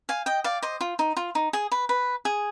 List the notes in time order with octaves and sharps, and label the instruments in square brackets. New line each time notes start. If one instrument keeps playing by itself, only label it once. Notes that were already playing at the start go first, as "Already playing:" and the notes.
[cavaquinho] F5 G#5
D#5 G5
D5 F5
C5 D#5
F4
D#4
F4
D#4
G#4
B4
B4
G#4